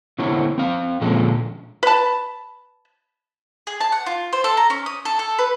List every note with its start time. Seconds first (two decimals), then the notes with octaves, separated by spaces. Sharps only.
0.19 D3 B3 C4 E4 C#5
0.58 C4 F5
1.01 A#2 D3 F3 G#3 C#4 A4
1.83 B4 A5
3.67 G#4
3.81 A5
3.92 F#5
4.06 F4
4.33 C5
4.44 A4
4.57 A#5
4.70 C#4
4.86 D#6
5.05 A4
5.19 A4
5.39 B4